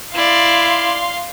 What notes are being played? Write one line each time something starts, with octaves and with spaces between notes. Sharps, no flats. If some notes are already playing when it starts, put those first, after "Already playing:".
E4 D5 F5 C6